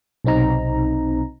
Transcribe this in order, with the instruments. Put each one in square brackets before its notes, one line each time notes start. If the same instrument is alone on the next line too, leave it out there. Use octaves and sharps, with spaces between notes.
[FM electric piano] B1 C3 C4 D#4 A#5